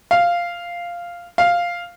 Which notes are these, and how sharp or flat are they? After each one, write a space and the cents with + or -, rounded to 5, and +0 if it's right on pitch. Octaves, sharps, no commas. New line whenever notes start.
F5 -5
F5 +0